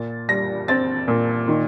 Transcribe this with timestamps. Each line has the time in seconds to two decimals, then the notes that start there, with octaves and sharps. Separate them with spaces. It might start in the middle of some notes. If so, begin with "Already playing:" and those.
Already playing: A#2 A6
0.29 G3 A#6
0.68 C4 A6
1.08 A#2
1.48 D#3